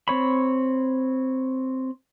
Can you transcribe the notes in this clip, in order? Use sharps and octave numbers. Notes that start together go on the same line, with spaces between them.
C4 C#5 B5